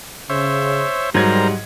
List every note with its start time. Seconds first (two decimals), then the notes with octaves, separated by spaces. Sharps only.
0.30 C#3 C5 C#5 E5
1.14 G#2 F#3 G3 A#4 C5 A#5 G#6